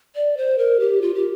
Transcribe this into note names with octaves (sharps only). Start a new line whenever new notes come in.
D5
C5
A#4
G4
F4
G4